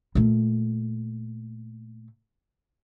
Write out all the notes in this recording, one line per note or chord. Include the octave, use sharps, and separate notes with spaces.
A#2 A3